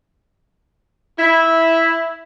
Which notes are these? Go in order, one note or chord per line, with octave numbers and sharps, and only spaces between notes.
E4